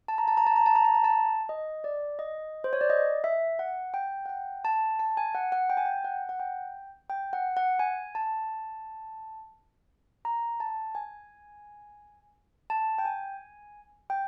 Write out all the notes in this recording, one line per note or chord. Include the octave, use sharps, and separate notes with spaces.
A5
A#5
A5
A#5
A5
A#5
A5
A#5
A5
A#5
A5
D#5
D5
D#5
C5
C#5
D5
D#5
E5
F#5
G5
F#5
G5
A5
A5
G#5
F#5
F#5
G5
G#5
G5
F#5
F#5
G5
G5
F#5
F#5
G#5
A5
A#5
A5
G#5
A5
G5
G#5
G5